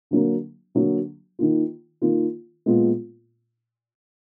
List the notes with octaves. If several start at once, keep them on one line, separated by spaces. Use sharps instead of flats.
D3 F#3 A#3
D3 F#3 A#3
D#3 A#3 F4
D#3 A#3 F4
A#2 G#3 B3 F4